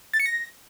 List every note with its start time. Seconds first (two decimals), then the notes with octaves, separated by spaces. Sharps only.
0.14 A6
0.20 C#7
0.26 A#6